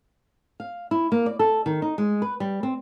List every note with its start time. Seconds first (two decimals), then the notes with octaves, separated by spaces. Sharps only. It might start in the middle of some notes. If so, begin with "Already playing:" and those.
0.60 F5
0.91 E4
1.12 A#3
1.26 D5
1.39 A4
1.66 D#3
1.82 D#4
1.98 G#3
2.22 B4
2.40 G3
2.63 C4